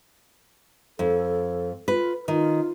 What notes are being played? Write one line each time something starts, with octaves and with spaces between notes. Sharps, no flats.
F2 A4
F4 B4
D#3 F4